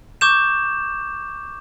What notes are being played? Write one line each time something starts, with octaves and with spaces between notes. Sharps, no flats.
C#6 D6 G6 E7